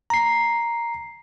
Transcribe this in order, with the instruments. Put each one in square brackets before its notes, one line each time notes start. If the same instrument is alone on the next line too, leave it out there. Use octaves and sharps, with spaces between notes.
[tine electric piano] A#5 C7